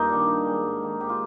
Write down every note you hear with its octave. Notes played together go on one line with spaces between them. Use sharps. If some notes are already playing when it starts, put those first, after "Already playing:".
Already playing: G2 A#3 D#4 F4
D#3 G3 D4
D#3
G#3 D4
G#2
D#3 A#3
G#2 G4
F4